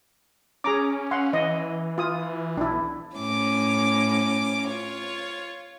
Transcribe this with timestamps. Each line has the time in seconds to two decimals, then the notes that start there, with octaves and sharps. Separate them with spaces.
0.64 C#4 G#4 A#5 D6
1.11 F5 F#5 C6
1.33 E3 D#5
1.98 F4 D#6
2.57 B1 D4 E4
3.17 A2 C#4 D6
4.68 F4 C#5